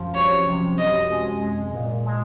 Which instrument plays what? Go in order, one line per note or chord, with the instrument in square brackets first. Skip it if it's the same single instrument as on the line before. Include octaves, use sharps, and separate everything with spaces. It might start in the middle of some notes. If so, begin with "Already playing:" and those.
Already playing: [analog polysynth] F#2 F3
[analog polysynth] C2 [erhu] C#5
[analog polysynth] C3
[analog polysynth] F#2 [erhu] D#5
[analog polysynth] G#3
G#3
A#2
G#3